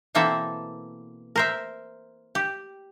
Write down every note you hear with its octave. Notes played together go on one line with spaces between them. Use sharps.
B2 E3 A#3 C4 A4 E5
A#4 C5 E5
G4